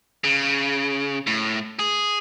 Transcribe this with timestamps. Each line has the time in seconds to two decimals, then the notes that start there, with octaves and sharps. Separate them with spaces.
0.24 C#3
1.27 A2
1.79 G#4